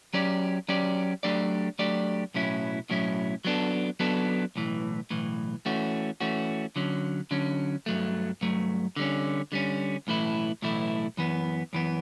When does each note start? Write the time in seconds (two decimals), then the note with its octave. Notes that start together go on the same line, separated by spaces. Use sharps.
0.13 F#3 C#4 G4 D5
0.68 F#3 C#4 G4 D5
1.23 F#3 A3 D4 G4 D5
1.79 F#3 A3 D4 G4 D5
2.34 B1 A2 F#3 C#4 E4
2.89 B1 A2 F#3 C#4 E4
3.45 F#3 B3 D4 A4
4.00 F#3 B3 D4 A4
4.55 B1 A2 E3
5.10 B1 A2 E3
5.66 E3 A3 C#4 F#4
6.20 E3 A3 C#4 F#4
6.76 D3 F#3 C#4
7.31 D3 F#3 C#4
7.86 G2 F#3 A3
8.41 G2 F#3 A3
8.96 D3 G3 C#4
9.52 D3 G3 C#4
10.07 B1 A2 E3 A3 E4
10.62 B1 A2 E3 A3 E4
11.17 F#2 E3 B3
11.73 F#2 E3 B3